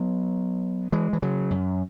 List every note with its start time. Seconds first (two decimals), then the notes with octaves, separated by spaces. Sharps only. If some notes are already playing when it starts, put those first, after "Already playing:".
Already playing: F#3 B3
0.92 E3 G#3
1.13 E3
1.22 C#3 F#3
1.51 F#2